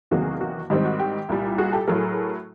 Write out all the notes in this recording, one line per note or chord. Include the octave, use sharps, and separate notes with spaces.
E2 C3 D#3 F#3 A#3 F#4 G#4
F#4
G#2 D#3 G3 C4 D#4 G4
F#4
G4
C2 A#2 G3
F#4 G#4
G4 A4
A2 F#3 A3 G#4 A#4